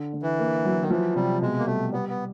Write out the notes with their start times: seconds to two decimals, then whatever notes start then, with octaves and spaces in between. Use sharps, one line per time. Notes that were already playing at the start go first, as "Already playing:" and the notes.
Already playing: D3
0.14 D3
0.22 E3
0.39 A#3
0.65 F#3
0.82 D#3
0.90 E3 F3
1.16 C3 G3
1.42 B2 G#3
1.59 A#3
1.66 G3 A3
1.93 G3 B3
2.09 B3